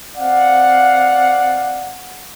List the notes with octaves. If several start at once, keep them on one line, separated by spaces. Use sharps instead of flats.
C4 D5 F5 F#5